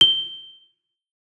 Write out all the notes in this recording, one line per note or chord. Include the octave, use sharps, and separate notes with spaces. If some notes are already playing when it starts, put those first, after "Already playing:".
G7